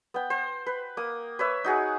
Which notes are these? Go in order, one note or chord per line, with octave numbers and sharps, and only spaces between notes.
B3 G5
C5
B4
A#3 D#6
B4 C#5 E5
D#4 F#4 G#4